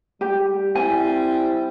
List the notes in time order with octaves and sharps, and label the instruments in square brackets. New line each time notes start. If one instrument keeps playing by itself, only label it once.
[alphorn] G3 [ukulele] G4
[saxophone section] G3 C4 [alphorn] E4 [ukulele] G#5